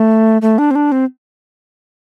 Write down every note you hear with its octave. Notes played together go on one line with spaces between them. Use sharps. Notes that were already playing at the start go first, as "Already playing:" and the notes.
Already playing: A3
A3
D4
C4
D4
C4